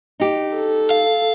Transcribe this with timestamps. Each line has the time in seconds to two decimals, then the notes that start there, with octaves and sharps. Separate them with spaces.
0.20 D#4 G4
0.56 A4
0.91 F5